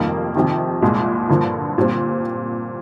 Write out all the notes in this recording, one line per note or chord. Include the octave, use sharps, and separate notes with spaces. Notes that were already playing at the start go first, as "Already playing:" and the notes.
Already playing: F1 F2 D#3 G3 A#3
F2 C3 D#3
C2 A#2 G#3
G2 D3 F3 A#3
A#2 G3 C4